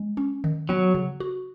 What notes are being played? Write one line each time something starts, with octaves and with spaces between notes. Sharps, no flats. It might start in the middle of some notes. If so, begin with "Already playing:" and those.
Already playing: G#3
C#4
D#3
F#3 B3
C#3
F#4